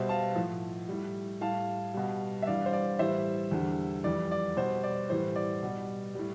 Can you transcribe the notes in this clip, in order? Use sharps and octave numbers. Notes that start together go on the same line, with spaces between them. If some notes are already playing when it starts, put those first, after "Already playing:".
Already playing: B2 G3 C5 E5
F5 A5
A2 F3
A2 G3
A2 G3 F5 A5
B2 G3
E5
G2 E3 G3 D5 F5
C5
D5
A2 E3 G3 C5 E5
E2 D3 G3
F2 E3 G3 D5
D5
B2 G3 C5
D5
A2 E3 G3 C5
D5
B2 G3
A2 G3